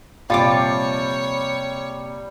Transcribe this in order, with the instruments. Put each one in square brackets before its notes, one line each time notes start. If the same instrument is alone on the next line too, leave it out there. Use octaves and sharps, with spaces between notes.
[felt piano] A#1 C3 [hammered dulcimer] G3 [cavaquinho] F4 A5 D6 [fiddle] C#5